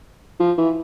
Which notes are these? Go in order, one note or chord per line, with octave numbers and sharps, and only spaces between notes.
F3
E3